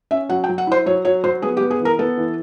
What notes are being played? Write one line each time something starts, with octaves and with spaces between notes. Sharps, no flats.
C#4 E5
F#3 F#5
G5
F#3
F#5
E4 C5
F#3 C#5
F#3 C#5
F#3 C5
B3 G#4
G4
B3
G#4
E3
A#4
B3 A4
E3